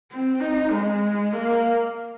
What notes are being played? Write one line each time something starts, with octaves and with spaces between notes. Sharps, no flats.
C4
D#4
G#3
A#3